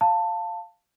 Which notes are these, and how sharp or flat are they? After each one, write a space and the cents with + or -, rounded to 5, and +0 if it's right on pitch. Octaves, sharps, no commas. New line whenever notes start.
F5 +0 A5 +15